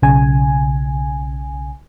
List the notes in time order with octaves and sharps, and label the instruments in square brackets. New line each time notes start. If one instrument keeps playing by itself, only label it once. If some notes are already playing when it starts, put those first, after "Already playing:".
[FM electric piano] B1 C#3 G#5